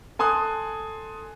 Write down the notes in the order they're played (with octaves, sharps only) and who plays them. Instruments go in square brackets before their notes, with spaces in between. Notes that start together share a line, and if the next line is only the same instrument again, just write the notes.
[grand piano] A4 G#5 C6 D#6 F#6